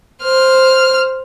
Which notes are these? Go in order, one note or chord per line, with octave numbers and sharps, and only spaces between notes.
C5 F6